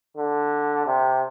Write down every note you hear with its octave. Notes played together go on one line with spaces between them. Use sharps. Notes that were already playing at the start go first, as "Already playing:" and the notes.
D3
C3